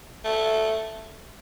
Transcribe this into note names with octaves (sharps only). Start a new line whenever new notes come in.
A3